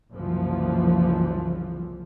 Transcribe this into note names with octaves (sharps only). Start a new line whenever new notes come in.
F#1 C2 E3 F3